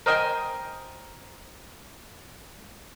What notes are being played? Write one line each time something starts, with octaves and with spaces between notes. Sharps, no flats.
A#4 C5 D#5 G5 G#5 C6